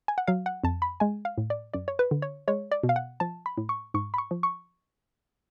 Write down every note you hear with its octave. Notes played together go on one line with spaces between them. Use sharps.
G#5
F#5
F#3 F5
F#5
F2 A5
B5
G#3 G#5
F5
A2
D5
F#2 D5
C#5
B4
D3
C#5
G#3 C#5
D5
B2
F5
F#5
F3 A5
B5
A2
C#6
G#2 C#6
B5
C#6
F3
C#6